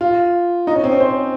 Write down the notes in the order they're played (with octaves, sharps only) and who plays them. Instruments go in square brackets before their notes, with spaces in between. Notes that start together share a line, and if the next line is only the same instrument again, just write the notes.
[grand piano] F4
D#4
C#4
C4
C#4
C5